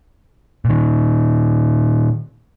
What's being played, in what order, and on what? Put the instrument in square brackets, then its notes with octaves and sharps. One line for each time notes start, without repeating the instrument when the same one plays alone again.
[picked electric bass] A#2 D#3